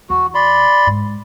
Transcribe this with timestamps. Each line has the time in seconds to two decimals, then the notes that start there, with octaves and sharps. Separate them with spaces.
0.10 E2 F#4
0.35 D5 B5 C6
0.87 G#2